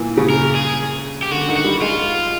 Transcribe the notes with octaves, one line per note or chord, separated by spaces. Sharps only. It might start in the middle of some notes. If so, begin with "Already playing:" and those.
Already playing: A#2 E3
C#3
A#4
G#4
G4
D3 F#4
D#3
F#4
G3
G#3 F4